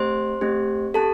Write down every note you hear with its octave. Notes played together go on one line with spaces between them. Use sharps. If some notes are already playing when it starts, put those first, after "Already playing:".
Already playing: A3 C4 G4 C5 C6
A3 C4 G4
C4 G4 A4 A5